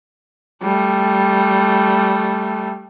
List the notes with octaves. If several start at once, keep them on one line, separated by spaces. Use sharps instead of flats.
G3 A3